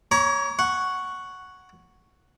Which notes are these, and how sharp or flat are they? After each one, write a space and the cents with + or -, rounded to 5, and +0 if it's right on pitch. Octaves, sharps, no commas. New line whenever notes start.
C#5 +5 A#5 +30 D6 -45
F#5 +0 C#6 +0